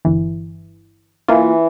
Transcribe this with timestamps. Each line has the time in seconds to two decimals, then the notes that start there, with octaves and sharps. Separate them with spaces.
0.05 G1 E3
1.28 E3 A#3 F4